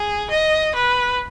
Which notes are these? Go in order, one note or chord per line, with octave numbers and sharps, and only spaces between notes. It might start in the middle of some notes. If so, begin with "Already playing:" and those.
Already playing: G#4
D#5
B4